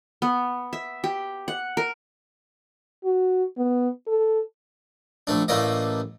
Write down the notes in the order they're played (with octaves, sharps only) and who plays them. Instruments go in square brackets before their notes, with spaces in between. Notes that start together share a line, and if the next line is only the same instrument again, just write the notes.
[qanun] B3
E5
G4
F#5
A#4
[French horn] F#4
B3
A4
[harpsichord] A#1 A3 D4
A1 A3 A#3 D5 D#5